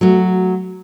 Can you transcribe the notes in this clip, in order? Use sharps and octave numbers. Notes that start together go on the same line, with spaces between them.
F#3 A3 F#4